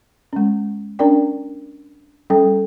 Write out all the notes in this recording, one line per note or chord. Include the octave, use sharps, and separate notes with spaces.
G#3 C#4
C#4 D4 A#4 D5 G5
G3 C#4 A4 G5